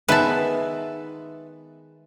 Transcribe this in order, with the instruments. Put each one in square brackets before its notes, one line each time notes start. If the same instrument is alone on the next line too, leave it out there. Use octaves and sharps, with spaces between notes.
[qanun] D#3 G#3 B3 [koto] B4 A5 [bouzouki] E5